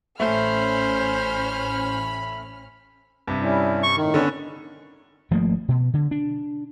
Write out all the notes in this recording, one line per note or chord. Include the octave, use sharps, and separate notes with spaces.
A1 A3 C#4 C5 B5 F6
G2 C3
G3 C#4 E4
C#6
A2 D#3
D3 B3 C#4 D4
G#1 F3 A3 A#3
B2
D3
D4